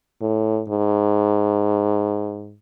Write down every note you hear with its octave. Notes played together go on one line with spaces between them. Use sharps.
A2
G#2